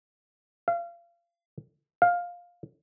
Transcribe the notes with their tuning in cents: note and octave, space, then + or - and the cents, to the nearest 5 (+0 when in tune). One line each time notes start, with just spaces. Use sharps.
F5 -30
F5 +10